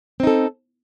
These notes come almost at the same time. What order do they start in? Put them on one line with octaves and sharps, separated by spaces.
C4 D#4 A4